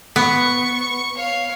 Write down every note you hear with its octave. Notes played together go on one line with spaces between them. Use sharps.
B3 C#6
C#5 F5